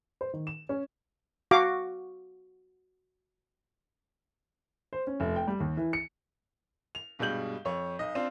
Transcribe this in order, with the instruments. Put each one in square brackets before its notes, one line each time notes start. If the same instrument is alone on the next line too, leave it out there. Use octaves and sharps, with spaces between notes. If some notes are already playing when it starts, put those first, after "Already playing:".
[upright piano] C5
D#3
E7
C#4
[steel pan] F#4 F5 D6
[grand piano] C5
C#4
F1
G5
G3
D#2
E3
C#7
[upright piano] F7
G2 B2 G3 G#3 G6 F#7
F2 C#5
B1 D#5
C4 D4 F4 C5